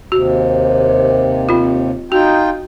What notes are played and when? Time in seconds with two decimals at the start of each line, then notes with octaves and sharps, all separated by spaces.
0.12 D#2 C3 F#4
1.49 C4 F4
2.12 D#4 F4 F#4 G5